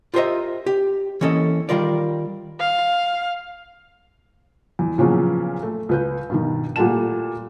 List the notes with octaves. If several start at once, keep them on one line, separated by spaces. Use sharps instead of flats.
F4 G4 A#4 C5 D#5 E5
G4
E3 A#3 C#4 A4 D#5
D#3 G3 F4 A#4 D5
F5
E2
A#2 C#3 F3 F#3 B3
A3
C#2 B4 G6
G2 B2 D#3
A#2 G3 A3 F#5 A5 E7